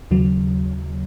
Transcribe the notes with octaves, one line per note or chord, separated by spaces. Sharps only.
D#2 C#3 F#3